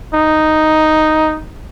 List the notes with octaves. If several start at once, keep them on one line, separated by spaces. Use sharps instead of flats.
D#4